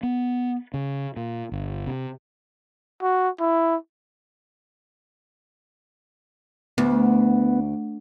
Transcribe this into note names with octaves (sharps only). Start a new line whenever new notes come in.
B3
C#3
A#2
G1
C3
F#4
E4
D2 B3